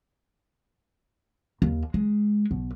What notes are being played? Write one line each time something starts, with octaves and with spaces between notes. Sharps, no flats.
D#2
G#3
B1